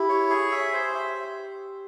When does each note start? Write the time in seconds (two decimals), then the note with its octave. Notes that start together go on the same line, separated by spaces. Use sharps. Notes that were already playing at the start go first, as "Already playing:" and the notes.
Already playing: E4 G4
0.09 C#5
0.30 G#4
0.52 E5
0.73 C5
0.95 E5